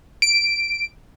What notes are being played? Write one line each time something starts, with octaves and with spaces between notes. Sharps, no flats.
D7